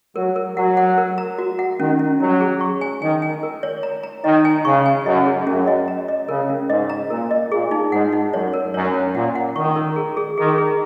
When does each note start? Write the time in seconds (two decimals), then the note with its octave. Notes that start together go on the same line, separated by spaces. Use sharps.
0.16 F#3 A#4
0.36 A#4
0.56 F#3 F#5
0.77 F#5
0.98 A#4
1.18 A#5
1.38 F#4
1.59 F#5
1.80 D#3 C#4
1.99 C#4
2.20 F#3 C#4
2.41 G#4
2.61 C#6
2.81 G#5
3.01 D#3 G#5
3.22 G#5
3.43 A#4
3.63 C#5
3.83 A#5
4.03 A#5
4.24 D#3 D#5
4.45 G#5
4.65 C#3 C#6
4.86 G#5
5.06 F#2 D#5
5.26 G#4
5.47 F#2 C#4
5.67 D#5
5.88 A#5
6.08 D#5
6.29 C#3 A#4
6.50 C#4
6.69 G#2 D#5
6.90 A#5
7.10 A#2 A#4
7.31 D#5
7.51 A#2 G#4
7.71 D#4
7.92 G#2 F#5
8.13 D#4
8.33 F#2 C#5
8.54 A#4
8.74 F#2 C#5
8.94 C#4
9.15 A#2 F#5
9.35 F#5
9.56 D#3 C#6
9.76 A#4
9.96 G#4
10.17 G#4
10.37 D#3 G#4
10.58 G#4